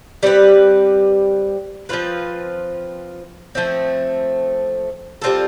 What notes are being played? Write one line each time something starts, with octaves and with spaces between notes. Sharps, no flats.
G3 C4 G4 B4
F3 C4 F4 B4
F3 A3 C4
G3 C4 F4 A4